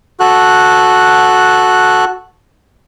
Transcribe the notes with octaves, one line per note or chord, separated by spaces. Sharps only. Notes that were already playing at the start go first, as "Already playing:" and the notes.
F#4 A4 F#6